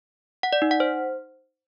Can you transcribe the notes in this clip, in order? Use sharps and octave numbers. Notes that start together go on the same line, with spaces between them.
F#5
D5
D#4
F#5
C5